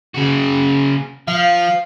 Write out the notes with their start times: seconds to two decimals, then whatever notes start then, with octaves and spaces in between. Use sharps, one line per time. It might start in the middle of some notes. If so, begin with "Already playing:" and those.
0.14 C#3 F#4
1.28 F3 F5